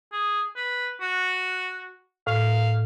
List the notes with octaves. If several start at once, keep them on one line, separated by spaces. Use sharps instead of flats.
G#4
B4
F#4
A2 F5